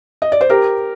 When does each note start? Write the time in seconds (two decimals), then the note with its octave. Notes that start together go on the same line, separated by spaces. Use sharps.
0.22 D#5
0.32 D5
0.41 C5
0.50 G4 A#4